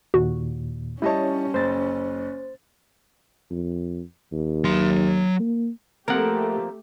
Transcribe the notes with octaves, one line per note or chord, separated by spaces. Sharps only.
D#2 A#2 F#4
G3 C#4 E4 C#5 D#5 A5
F#1 C5 A6
F2
D#2
F#3 C6
A#3
F3 A3 A#3 C4 G4 A#4 F#5